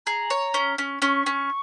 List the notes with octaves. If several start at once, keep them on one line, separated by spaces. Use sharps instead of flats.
G#4 A#5
C#5
C#4
C#4
C#4 C#6
C#4